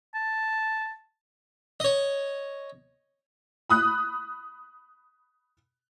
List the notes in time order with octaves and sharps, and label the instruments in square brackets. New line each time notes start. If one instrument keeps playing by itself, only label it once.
[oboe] A5
[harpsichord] C#5 D#5
[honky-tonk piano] B5 D#6 F#6